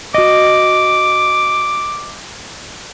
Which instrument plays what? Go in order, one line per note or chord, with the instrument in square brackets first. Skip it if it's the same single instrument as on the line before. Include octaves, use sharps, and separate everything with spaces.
[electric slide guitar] F#4 D#5 [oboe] D6